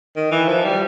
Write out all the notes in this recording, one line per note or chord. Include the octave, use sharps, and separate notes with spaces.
D#3
E3
F3
G3